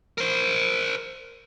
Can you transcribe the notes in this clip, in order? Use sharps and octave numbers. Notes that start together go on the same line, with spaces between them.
A#4 C5